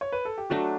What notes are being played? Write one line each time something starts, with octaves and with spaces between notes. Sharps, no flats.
C#5
B4
A4
G4
F#3 A3 D4 F#4